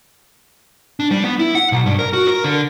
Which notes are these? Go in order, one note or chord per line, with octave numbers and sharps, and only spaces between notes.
D4
G3
B3
E4
F#5
B1
G2
A#4
F#4
A#4
D3